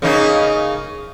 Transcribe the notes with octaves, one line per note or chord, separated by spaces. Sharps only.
C#3 A#3 D#4